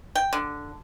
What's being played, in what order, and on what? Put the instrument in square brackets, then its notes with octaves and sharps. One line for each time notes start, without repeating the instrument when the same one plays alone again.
[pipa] G5
D3